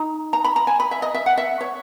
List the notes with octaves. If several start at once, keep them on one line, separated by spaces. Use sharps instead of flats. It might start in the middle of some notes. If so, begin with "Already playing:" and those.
Already playing: D#4 A#5
A#5
B5
A#5
G#5
B5
E5
D#5
E5
F#5
E5
C#5